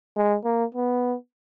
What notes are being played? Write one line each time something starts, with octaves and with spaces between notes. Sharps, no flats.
G#3
A#3
B3